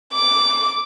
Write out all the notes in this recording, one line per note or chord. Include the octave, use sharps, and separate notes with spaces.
D6